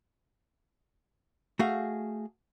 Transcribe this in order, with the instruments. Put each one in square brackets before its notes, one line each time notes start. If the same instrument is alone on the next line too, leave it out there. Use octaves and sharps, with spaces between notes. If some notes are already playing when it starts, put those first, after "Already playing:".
[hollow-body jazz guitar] A3 F#4 G#4 F5